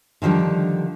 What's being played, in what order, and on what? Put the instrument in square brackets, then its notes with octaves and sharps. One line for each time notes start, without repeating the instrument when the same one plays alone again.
[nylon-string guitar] D3 D#3 F3 G3 D4